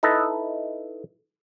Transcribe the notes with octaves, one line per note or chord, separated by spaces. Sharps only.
D#4 E4 A4 B4 D#5